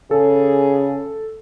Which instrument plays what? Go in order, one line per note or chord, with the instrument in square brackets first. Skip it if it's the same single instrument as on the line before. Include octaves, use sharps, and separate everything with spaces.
[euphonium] C#3 [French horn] G#4 [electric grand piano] A4